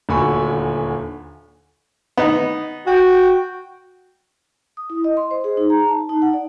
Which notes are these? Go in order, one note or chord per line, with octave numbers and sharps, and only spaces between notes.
D#1 D2 D3 G#5 B5 C#6
B3 D#4
F#4 G5
D#6
E4
D#5
C6
C5
G#4
D#4
A#5
A5
D#4
F#5
D5